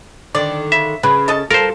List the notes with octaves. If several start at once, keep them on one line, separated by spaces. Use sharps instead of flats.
D3 D#3 D5
C#3 E5
C#3 B4
A4 D#5 A5
F4 A4 A#4 C5